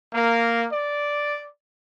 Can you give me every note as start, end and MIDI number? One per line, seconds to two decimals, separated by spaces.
0.14 0.66 58
0.72 1.46 74